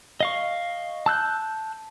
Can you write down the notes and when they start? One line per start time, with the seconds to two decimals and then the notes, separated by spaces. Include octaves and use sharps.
0.20 D#5 F5 C#6
1.06 A5 E6 F#6 G6